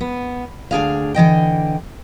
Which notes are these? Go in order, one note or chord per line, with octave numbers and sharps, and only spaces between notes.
B3
D2 D4 G#4 F5
D3 E3 D#5 G5